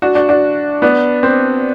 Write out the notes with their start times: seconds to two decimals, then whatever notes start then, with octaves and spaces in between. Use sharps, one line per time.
0.02 D4 F#4
0.15 D4 F#4
0.29 D4 F#4
0.82 B3 D4
1.23 C4